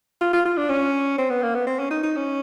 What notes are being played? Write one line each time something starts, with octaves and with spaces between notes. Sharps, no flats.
F4
F4
F4
D4
C#4
C4
B3
A#3
B3
C4
C#4
D#4
D#4
C#4